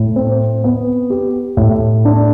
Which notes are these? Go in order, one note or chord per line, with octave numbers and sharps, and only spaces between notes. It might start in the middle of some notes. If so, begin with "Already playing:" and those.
Already playing: A2
C4
B3
G4
A2
D4